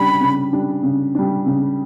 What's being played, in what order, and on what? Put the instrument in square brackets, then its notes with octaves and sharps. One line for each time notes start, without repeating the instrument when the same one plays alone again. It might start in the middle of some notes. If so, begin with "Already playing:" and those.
Already playing: [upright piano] C#3 G3 D4 [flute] B5
[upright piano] C#3
G3 D4
C#3
G3 D4
C#3